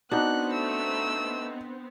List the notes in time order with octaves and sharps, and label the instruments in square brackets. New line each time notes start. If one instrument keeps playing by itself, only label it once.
[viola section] B3 C4 [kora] D4 [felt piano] D#4 F#4 [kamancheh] F#6
[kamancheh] A3 E6